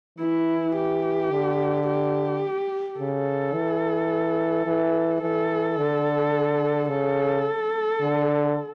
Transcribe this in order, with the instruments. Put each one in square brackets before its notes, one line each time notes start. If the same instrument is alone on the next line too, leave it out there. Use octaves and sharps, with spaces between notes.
[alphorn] E3 [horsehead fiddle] E4
[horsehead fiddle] G4
[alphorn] D3
[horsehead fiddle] G4
[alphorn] C#3 [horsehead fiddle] A4
[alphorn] E3
E3
[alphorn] E3 [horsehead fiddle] A4
[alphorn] D3
[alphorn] C#3 [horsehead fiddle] A4
[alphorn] D3